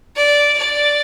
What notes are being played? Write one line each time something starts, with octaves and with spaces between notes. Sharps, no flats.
D5
D5